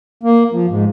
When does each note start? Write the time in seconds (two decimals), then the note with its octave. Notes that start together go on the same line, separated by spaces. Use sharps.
0.23 A#3
0.52 F3
0.68 G#2